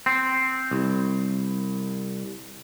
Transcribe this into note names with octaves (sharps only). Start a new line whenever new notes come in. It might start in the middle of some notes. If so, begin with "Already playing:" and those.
C4
C2